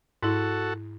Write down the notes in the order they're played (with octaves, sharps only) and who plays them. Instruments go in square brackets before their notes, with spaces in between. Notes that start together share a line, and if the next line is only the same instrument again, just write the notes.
[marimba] G#2 E4 [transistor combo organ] F#4 A4